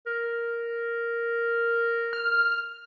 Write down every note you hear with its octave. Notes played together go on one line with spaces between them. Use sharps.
A#4
F6